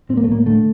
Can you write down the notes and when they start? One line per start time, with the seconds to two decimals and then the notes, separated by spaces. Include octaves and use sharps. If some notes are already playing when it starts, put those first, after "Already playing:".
0.09 A2 C4
0.17 A#3
0.24 A3
0.28 A2 A#3
0.46 D3 A3